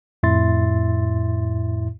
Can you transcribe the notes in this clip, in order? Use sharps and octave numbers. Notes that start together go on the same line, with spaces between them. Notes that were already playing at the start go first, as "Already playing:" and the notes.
F2 A2 E4 E5 C6 A6